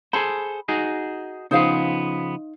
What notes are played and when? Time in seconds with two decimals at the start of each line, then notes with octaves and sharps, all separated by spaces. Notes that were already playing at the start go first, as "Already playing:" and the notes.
0.13 G#4 A4 C5 B5
0.68 D#4 F#4 G#4
1.51 C#3 F3 B3 D#4 C5 F5